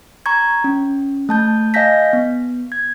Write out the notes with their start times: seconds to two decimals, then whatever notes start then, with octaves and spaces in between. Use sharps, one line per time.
0.26 A#5 C#6 G#6
0.64 C#4
1.29 A3 A5 G6
1.74 D#5 F5 G#5 G6 A#6 B6
2.13 B3
2.72 G#6